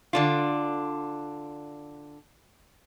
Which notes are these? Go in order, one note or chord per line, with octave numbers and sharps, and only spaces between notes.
D3 D4 F4